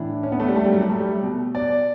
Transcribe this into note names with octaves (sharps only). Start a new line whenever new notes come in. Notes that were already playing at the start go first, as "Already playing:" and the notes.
Already playing: A2 E3 D4
C#4
B3
A3
G3
A3
G3
F#3
G3
A3
G3
B2
D5